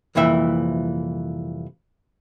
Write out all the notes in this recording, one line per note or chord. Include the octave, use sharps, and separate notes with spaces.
C2 F2 A#2 E3 E5